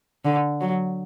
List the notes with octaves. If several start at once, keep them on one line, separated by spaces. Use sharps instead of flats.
D3
F#3